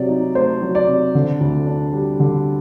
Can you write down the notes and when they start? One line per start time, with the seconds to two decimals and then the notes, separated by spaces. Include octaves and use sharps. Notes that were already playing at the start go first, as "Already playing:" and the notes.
Already playing: C3 F#3 D5
0.09 D#4
0.35 A3 C5
0.62 F#3
0.75 D5
0.87 C3
1.15 D3
1.41 D2
1.66 D4
1.93 G3
2.20 D3